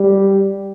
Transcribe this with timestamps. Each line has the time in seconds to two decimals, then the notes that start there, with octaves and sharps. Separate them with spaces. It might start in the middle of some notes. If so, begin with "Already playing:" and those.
Already playing: G3